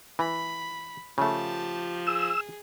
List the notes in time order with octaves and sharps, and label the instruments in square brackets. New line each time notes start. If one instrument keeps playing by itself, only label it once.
[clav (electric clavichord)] E3 [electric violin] B5
[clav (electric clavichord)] C#3 A3 [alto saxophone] F3 [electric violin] G4 A5
[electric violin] G#4 [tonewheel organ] E6